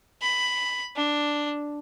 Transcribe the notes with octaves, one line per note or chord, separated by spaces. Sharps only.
B5
D4